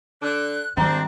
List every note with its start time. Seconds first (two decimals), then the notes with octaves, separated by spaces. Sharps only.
0.22 D3 D4 F#6
0.77 G#1 G3 C4 D4 A#5